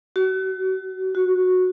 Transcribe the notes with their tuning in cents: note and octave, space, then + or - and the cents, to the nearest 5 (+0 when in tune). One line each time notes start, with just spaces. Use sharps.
F#4 +35
F#4 -10